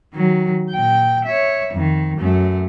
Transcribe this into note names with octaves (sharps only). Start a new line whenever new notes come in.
D#3 F#3
A#2 G5
C#5 E5
F2 D#3
F#2 A3